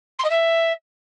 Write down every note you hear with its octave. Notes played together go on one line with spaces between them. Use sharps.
C6
D#5
E5